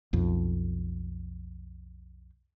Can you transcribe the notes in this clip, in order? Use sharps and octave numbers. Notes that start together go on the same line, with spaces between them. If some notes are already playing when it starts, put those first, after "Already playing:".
B1 F2